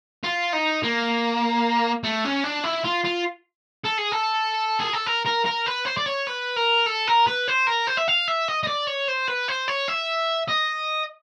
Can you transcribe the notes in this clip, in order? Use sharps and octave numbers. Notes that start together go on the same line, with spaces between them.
F4
D#4
A#3
A3
C#4
D4
E4
F4
F4
A4
G#4
A4
G#4
A4
A#4
A#4
A#4
B4
C5
D5
C#5
B4
A#4
A4
A#4
B4
C5
A#4
C5
E5
F5
E5
D#5
D#5
D5
C#5
C5
B4
C5
C#5
E5
D#5